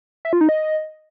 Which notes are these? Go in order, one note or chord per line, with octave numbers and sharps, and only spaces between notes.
E5
F4
D#4
D#5